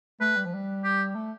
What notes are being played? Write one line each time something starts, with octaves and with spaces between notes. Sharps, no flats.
A3 B4
G3
F3
G3
G4
A3